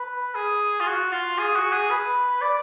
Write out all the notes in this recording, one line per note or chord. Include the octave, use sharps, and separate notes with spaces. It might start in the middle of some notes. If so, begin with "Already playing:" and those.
Already playing: B4
G#4
F4
F#4
F4
G#4
F#4
G#4
B4
D5